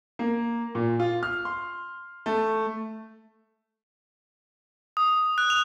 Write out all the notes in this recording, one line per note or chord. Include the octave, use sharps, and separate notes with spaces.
A#3
A#2
F4
F6
C6
A3
D#6
F#6
F7